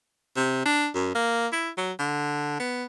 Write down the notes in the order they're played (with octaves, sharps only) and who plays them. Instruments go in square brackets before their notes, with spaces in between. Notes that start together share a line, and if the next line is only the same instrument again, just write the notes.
[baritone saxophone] C3
D4
F#2
A#3
E4
F#3
D3
B3